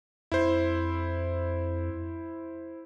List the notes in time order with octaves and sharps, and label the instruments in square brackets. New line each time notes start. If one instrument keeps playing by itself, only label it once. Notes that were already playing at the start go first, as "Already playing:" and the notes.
[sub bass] F2 [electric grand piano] E4 C5